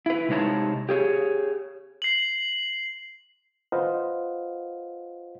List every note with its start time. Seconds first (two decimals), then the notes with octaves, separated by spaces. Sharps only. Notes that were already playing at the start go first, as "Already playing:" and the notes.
0.06 E4 B4
0.28 C3 G#3 D#4 C#5 A5
0.89 G4 G#4 C#5
2.02 C7 F#7
3.72 F4 B4 C5 D#5 F5 F#5